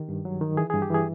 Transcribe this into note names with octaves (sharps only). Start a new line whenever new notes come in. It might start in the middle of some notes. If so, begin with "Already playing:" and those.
Already playing: D#3 G4
G2
F#3
D#3
E3 G#4
G2 G#4
G4
E3 G#4